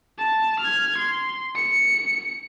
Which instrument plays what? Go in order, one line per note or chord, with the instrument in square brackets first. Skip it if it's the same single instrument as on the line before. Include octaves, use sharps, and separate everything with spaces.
[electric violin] A5
F6 G#6
C6
C#7